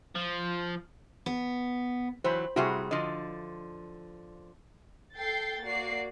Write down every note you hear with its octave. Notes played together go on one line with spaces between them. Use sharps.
F3
B3
E3 F#3 C5 B5
C3 G3 E4 F#4 G#4 C6
D3 F3 D#5
A4 G5 G6 A6 C7
A#3 F#4 D5 C7